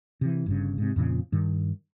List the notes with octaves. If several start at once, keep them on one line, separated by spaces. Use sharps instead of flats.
C3 E3
G1 G2 C#3
G#2 C3
F2 A#2 C#3 F3
G2 D#3